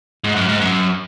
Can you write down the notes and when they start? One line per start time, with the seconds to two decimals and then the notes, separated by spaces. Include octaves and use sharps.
0.24 G#2
0.36 F#2
0.49 G#2
0.61 F#2